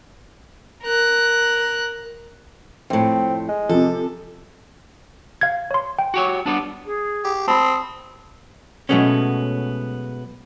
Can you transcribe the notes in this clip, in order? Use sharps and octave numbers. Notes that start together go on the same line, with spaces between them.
A#4 F#6
F2 A2 C4
G#3
C3 F3 A4
F5 G#6
C#5 C6
G5
F#4 G4 C#5
G3 B3 D4
G#4
G4
C4 A5 B5 D#6
B2 F#3 G#3 A3 B3 C#4